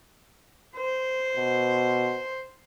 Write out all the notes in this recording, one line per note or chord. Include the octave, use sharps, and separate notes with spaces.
C5
B2